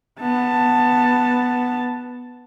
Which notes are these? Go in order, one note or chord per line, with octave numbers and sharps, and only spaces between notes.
B3 A5